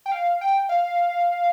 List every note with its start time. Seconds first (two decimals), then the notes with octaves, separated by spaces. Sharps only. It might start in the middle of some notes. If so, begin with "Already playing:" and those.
0.06 G5
0.12 F5
0.41 G5
0.69 F5